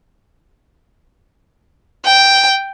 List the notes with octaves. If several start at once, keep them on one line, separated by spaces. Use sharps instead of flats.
G5